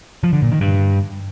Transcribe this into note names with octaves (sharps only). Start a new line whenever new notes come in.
F3
D3
A#2
D#3
G2